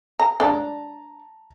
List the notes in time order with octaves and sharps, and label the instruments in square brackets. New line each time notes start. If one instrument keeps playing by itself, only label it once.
[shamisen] A#5
[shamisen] D4 D5 [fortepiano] A5 A#5